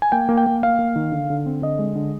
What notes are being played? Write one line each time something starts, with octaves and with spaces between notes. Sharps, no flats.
G#5
A#3 G5
A#3
G5
A#3
A#3 F5
A#3
D#3
D3
D3
C4
D3 D#5
G#3
D3